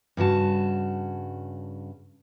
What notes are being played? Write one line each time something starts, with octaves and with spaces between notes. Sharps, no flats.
G2 C#3 F#4 A5